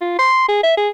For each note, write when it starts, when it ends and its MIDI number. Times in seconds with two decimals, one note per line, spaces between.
0.01 0.17 65
0.19 0.45 84
0.48 0.58 68
0.63 0.74 76
0.77 0.89 68